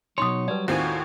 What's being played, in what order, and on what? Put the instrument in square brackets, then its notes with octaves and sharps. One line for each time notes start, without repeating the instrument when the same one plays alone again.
[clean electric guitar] B2 D#4 C#5 [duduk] F#3 [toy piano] C6 D#6
[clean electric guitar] G3 [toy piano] B4 D5
[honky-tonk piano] D#2 A2 C4 [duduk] F4 [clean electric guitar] F#4 G#5